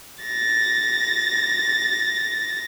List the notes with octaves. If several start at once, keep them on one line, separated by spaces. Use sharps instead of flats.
A6 A#6